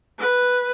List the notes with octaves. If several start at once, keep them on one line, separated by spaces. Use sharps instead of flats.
B4